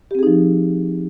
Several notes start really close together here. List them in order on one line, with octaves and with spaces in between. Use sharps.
G4 C4 G#4 D#4 F3